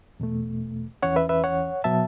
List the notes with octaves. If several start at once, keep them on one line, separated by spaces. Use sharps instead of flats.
E2 B2 A3
E2 E3 C#4 C#5 F#5
B4 E5
B4 E5
C#5 F#5
B2 F#3 B3 E5 A5